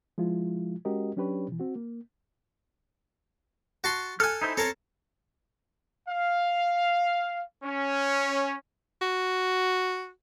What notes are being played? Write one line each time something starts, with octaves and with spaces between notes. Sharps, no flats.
F3 G#3 E4 F4
G#3 C#4 F#4 G4 A#4 D#5
F#3 C#4 D4 G4 B4 C#5
B2 E3
C4 F#4
A#3
F#4 A5 C6
A4 G#5 F6 F#6
D#4 E4 C5
C4 A4 A#4 C#5 A5
F5
C#4
F#4